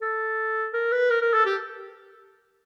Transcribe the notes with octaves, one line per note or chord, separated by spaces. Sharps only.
A4
A#4
B4
A#4
A#4
A4
G4